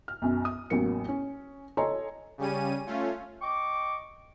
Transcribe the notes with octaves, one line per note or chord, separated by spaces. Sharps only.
F6
B1 F#2
D#6
A1 E2 F#3 A#3 C#7
C#4
A4 C#5 D#5 G#5 A#5 C6
C#3 G3 C#4 D#7
A3 C#4 F4
D#5 G5 C#6 D6